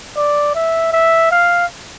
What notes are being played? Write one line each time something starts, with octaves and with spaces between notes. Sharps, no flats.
D5
E5
E5
F5